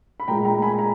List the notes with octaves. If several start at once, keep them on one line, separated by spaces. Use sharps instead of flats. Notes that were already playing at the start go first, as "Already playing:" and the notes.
B5
A#2 G#3 G5 A#5
G5 A#5
G#5 B5
A#5